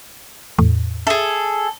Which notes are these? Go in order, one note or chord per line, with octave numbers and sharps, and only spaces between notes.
E2 A2
G#4 A4 E5